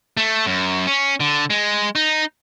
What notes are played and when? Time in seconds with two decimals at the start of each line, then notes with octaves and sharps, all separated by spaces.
0.17 A3
0.47 F#2
0.87 C#4
1.20 D3
1.50 G#3
1.95 D#4